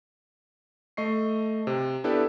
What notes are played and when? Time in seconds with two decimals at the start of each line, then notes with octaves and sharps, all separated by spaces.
0.97 A3 D#5 C#6 C7
1.67 C3
2.04 B3 D4 E4 G4 A4 B4